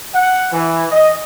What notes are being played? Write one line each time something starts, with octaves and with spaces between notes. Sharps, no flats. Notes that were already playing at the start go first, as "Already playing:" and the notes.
F#5
E3
D#5